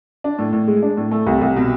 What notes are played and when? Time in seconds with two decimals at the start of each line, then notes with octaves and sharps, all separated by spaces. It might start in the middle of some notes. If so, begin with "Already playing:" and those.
0.24 D4
0.39 A2
0.53 A2
0.67 G#3
0.82 D4
0.97 A2
1.11 A3
1.26 C2
1.41 C2
1.56 B2